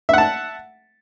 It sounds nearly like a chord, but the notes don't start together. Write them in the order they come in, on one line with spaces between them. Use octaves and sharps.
E5 F#5 A5